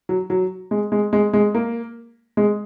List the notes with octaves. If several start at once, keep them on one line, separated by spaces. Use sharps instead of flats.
F#3
F#3
G#3
G#3
G#3
G#3
A#3
G#3